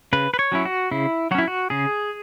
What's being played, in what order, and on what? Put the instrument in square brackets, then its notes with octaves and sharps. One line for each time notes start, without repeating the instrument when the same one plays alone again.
[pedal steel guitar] C#3 B4
B4
C#5
F#3 C#4 E4
F#4
C#3 E4
F#3 F#4
C#4 E4
F#4
C#3 G#4